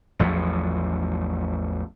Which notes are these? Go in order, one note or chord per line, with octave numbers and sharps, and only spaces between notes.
A1 E2 F3 F#3